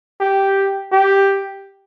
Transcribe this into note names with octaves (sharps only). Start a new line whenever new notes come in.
G4
G4